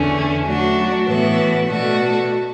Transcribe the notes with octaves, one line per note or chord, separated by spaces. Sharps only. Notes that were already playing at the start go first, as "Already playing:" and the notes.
Already playing: E2 D3 A3 C#4
F#3 A3 D4 F#4
A2 E3 B3 F#4 A4
B2 A3 D4 F#4 A4